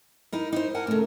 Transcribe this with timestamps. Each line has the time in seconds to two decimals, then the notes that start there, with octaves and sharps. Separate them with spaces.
0.32 D#4 E4 A#4
0.52 D#4 E4 C5
0.75 A#4 F#5 G#5 A5
0.87 A#2 C#3 A3